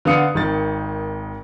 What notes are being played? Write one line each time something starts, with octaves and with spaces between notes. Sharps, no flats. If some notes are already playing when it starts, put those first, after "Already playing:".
D3 B3 F5 D#6 C#7
G#1 D#3 A6